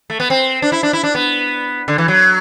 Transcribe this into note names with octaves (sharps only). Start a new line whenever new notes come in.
A3
B3
C4
D4
E4
D4
E4
D4
B3
D3
E3
F#3